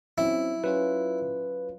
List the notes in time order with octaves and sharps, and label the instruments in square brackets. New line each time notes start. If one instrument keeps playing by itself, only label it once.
[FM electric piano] F#3 C4 C#4 [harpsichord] E4
[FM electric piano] F#3 C#4 F4 [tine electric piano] B4